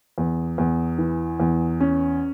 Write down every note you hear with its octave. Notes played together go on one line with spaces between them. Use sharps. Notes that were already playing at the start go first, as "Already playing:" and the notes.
E2
E2
E3
E2
C#4